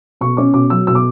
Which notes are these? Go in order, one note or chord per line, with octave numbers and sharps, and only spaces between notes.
B2 C#6
C#4 D6
B2 D6
F#3 E6
B2 E6
D6